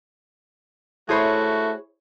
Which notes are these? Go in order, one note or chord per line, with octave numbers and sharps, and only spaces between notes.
A3 E4 F#4 G#4 C5 C#5 E5 B5